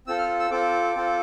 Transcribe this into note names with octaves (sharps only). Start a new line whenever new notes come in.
C4 F4 A4 E6
F6
E6
C4 F4 A4 D6
C4 F4 A4